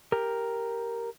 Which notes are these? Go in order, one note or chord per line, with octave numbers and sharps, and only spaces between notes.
G4 A#4